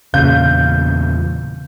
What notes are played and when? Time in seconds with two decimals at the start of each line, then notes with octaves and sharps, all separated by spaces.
0.14 E2 A#2 C#3 F5 G6